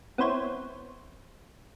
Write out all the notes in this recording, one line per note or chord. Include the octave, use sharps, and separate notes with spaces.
B3 C4 E4 C5 C#5